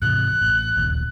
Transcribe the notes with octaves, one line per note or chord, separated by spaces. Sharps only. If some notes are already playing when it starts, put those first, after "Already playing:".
G#2 C3 E3 F#6
A1 A2
D1 A#1 D#2